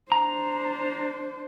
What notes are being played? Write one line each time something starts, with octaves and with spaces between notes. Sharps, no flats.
D4 C5 A#5